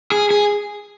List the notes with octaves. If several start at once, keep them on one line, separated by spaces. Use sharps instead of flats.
G#4
G#4